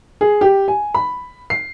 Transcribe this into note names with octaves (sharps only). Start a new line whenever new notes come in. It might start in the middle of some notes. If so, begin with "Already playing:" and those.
G#4
G4
G#5
B5
C7